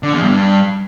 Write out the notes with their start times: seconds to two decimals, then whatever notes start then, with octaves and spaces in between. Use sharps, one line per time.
0.03 D3
0.13 E2
0.23 G2